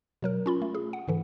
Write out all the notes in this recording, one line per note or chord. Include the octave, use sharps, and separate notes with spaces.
B2 F#3 A#4
C#4 F4 B5
A3
G#4
F#5
G#2 D3 E3